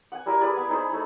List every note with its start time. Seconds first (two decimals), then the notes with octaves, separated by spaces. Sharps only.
0.12 F#5 G#5
0.26 G3 E4 A#4 G#5
0.41 E4 G#4 B4 D5
0.56 B3
0.69 D#4 E4 G#4 C5
0.91 A3 D#4